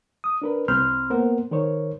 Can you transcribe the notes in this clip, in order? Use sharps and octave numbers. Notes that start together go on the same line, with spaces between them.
D#6
D4 A#4 B4
C2 C4 B5 C6 F6 G6
A#3 B3 A#4 C5 F#5
D#3 A#4 C5 C#5